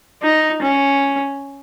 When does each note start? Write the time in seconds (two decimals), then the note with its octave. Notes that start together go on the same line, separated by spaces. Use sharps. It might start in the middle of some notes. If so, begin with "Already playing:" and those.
0.22 D#4
0.62 C#4